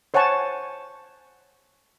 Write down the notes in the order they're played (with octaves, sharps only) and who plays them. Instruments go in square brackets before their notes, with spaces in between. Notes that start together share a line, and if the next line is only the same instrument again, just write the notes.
[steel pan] C5 C#5 F#5 G#5 A5 C#6